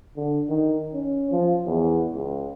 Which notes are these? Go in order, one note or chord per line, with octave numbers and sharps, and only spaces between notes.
D3
D#3
C#4
F3
E2
C#2